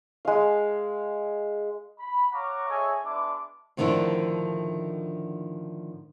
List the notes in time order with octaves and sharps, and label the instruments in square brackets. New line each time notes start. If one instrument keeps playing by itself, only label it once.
[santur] G#3 F5
[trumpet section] B5
C#5 F5 F#5 A#5 C#6 D6
G#4 A4 C#5 D#5 E5 G#5
G#3 B3 D4 E4 D6
[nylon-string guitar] A2 D3 D#3 F3 D4 E4